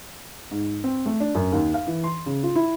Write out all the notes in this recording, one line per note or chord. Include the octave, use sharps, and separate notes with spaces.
G#2
C4
A3
D4
F#2
D#2
F5
E3
C6
C#3
F4
E4